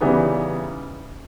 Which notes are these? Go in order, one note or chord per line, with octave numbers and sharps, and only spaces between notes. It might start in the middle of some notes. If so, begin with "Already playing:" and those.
C#3 E3 G3 B3 D#4